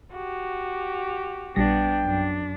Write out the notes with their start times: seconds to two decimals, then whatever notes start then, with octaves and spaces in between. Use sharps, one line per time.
0.13 F#4 G4
1.56 A#1 G3 B3 D4 G5 A#6
2.04 F#2 D4